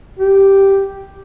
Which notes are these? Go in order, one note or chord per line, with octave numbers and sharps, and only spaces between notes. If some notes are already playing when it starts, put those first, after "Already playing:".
G4